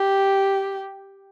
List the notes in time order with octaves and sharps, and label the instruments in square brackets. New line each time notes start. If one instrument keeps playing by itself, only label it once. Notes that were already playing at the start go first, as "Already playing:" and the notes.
Already playing: [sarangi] G4